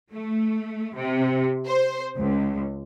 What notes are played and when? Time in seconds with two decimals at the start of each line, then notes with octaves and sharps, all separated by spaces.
0.12 A3
0.96 C3
1.66 C5
2.18 C#2